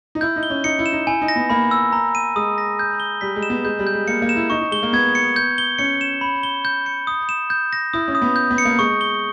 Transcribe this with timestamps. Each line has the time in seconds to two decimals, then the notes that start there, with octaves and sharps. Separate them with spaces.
0.15 D#4
0.21 E4 G6
0.36 D#4
0.43 G7
0.50 C#4
0.64 D#4 C#7
0.79 E4
0.86 E7
0.93 D#4
1.07 E4 G#5
1.22 D#4
1.28 A#6
1.36 B3
1.50 A#3 B5
1.71 E6
1.93 A#5
2.15 D#7
2.36 G#3 D#6
2.58 A#6
2.79 G6
3.00 G7
3.21 G3 B6
3.36 G#3
3.43 E7
3.50 B3
3.65 G#3 G6
3.79 G3
3.87 G6
3.93 G#3
4.08 A#3 C#7
4.22 A#3
4.29 E7
4.36 E4
4.50 D#4 C#6
4.61 D#4
4.71 G#3 G7
4.83 A#3
4.93 B3 G#6
5.15 C#7
5.36 G6
5.58 G7
5.78 C#4 C#7
6.01 E7
6.21 B5
6.43 G7
6.65 G6
6.86 C#7
7.07 D#6
7.29 E7
7.50 G6
7.73 A#6
7.93 E4 D#6
8.08 C#4
8.15 D#6
8.22 B3
8.36 G6
8.50 B3
8.58 C#7
8.65 A#3
8.79 G#3 C#6
9.01 G7